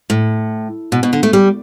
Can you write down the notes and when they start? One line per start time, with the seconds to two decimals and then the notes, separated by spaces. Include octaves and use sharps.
0.10 A2
0.92 B2
1.03 B2
1.13 D3
1.23 A3
1.33 G3